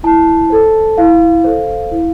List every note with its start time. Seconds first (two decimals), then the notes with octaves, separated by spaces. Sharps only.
0.03 E4 A5
0.50 A4 C5
0.98 E4 F5
1.44 A4 C5
1.91 E4